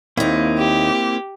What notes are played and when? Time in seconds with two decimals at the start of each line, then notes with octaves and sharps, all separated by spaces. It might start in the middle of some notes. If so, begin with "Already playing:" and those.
0.17 D#2 A#3 C4 D#4 E4
0.58 G4